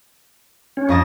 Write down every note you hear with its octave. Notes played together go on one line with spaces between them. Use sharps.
C#4
F2 D#5 A5